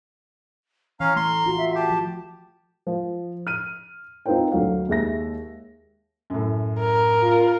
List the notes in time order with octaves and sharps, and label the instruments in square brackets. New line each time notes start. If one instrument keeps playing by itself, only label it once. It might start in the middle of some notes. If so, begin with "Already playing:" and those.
[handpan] E3 [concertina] C#4 F5 [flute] A#5
[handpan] A3 [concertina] C6
[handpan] A3 F4 F#4
[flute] E5
[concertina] G4 [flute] A5
[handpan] F3
[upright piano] F3
F6 D#7
C4 D#4 F4 B4 C5 G5
D2 F#3 F5
D#2 G#3 E5 A#6
[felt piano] F#2 A2
[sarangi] A#4
[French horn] F4